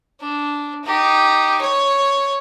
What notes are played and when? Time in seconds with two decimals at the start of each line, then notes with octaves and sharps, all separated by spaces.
0.21 D4
0.84 D#4 G4
1.61 C#5